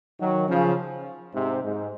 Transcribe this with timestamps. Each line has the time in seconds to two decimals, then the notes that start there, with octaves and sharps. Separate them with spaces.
0.19 D#3 F#3
0.48 C#3 F3
1.33 G#2 C3
1.62 G#2